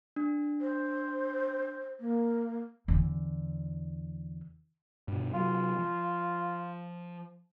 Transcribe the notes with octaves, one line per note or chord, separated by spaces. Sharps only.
D4
C5
A#3
E2 D3
G2 B2
C3 F#3 F4
F3